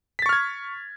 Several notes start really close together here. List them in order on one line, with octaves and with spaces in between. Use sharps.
B6 A6 C#6 F6 G#6